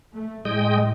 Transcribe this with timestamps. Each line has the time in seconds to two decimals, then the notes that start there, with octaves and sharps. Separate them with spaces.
0.16 A3
0.45 A2 G#3 D#5 G5